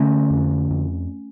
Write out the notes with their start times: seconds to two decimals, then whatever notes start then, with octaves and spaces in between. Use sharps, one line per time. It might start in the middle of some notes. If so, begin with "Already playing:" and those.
Already playing: D3 A3 C#4
0.31 F2
0.71 F2